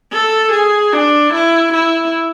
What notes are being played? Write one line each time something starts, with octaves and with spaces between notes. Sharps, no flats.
A4
G#4
D4
E4
E4